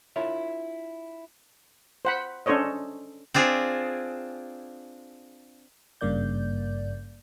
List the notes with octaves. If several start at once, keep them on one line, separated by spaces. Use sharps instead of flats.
D4 E4 F4 A#4 C#5 E5
C5 F#5 B5
C#4 D4 A4 C5 C#5 D#5
C4 D4 F4 G#4
G#1 G2 C#3 A#3 D5 G6